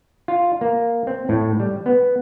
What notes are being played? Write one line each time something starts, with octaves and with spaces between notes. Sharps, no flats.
F4
A#3
C4
A2
G3
B3